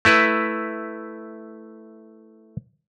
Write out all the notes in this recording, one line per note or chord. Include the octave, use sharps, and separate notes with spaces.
A3 E4 B4